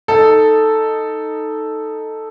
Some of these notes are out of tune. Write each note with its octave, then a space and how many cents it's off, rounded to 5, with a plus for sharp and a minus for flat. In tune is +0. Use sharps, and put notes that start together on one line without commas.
D#4 +0 A4 +0